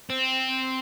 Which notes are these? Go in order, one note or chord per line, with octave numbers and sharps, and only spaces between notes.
C4